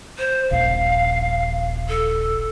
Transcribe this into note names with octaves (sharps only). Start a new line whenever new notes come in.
C5
D#1 A#1 F5
A4